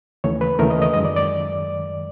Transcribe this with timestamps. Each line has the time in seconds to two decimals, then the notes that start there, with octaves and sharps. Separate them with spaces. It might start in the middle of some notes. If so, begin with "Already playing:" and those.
0.24 D#2 C#3 E3 A3 C#5
0.41 B4
0.59 D#2 C#3 E3 A3 A#4
0.70 D#5
0.82 D#5
0.93 F#2 D#3 G#3 D#5
1.05 D5
1.16 D5